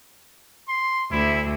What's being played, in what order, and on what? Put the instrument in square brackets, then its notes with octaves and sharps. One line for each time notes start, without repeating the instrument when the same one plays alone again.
[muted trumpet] C6
[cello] D2 [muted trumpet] E4